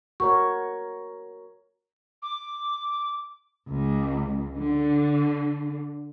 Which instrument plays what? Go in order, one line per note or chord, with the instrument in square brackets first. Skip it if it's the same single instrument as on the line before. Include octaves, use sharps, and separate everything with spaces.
[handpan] F#4 A#4 C#5 [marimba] C#6
[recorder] D6
[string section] C#2
D3